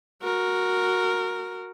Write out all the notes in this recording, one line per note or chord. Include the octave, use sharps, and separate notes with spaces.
F#4 A#4